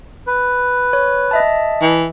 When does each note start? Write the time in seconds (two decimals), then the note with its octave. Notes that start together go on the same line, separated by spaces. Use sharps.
0.27 B4
0.93 C#5
1.31 D#5 E5 A5
1.82 E3